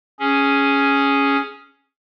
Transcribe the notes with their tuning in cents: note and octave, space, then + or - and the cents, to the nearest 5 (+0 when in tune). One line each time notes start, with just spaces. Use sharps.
C#4 +0 G#4 +0